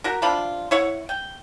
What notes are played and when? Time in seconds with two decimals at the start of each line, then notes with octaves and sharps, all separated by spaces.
0.04 F#4 G4 A#4
0.22 C3 D4 F4 B5
0.71 E4 C#5 F#5
1.09 G5